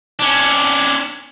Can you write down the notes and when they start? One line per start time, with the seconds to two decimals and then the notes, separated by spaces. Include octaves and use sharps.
0.19 C#4 D4